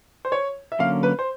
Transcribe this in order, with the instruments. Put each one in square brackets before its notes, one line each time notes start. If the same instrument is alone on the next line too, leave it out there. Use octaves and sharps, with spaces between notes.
[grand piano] C5
C#5
E5
[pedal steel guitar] D3 F#3 A#3 C#4 [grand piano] F5
[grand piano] B4
C5